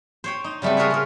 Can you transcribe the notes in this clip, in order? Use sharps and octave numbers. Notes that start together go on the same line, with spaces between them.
C5 C#5 G5
D#4
C#3 G3 A3 B3 C4
F4 G#4 A#4 B4 C#5 E5
C#4 G#4 A#4